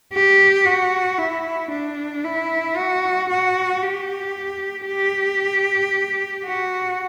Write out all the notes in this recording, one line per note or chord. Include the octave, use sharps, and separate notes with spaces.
G4
F#4
E4
D4
E4
F#4
F#4
G4
G4
F#4